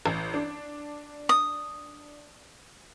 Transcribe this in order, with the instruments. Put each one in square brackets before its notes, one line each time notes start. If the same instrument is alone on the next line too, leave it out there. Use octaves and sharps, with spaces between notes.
[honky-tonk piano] A1
D4
[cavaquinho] D#6